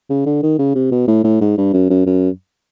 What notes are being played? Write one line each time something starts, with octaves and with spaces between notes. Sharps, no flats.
C#3
D3
D#3
C#3
C3
B2
A2
A2
G#2
G2
F#2
F#2
F#2